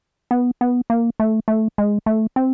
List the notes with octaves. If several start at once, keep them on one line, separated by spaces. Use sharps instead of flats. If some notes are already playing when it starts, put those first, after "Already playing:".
B3
B3
A#3
A3
A3
G#3
A3
C4